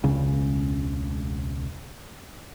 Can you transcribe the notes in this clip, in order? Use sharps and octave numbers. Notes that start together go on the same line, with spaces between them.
E1 C#2 C#3